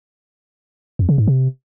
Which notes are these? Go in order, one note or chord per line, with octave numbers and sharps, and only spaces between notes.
F2
C#3
G#2
C3